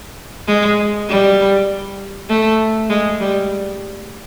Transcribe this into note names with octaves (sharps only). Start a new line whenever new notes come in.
G#3
G3
A3
G#3
G3